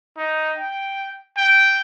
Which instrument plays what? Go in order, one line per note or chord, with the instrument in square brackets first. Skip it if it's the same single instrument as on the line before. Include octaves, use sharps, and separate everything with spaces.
[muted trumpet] D#4
G5
G5